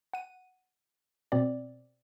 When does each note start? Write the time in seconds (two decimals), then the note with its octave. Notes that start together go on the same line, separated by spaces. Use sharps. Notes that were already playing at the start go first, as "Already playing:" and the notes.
0.13 F#5 D#7
1.32 B2 C4 D5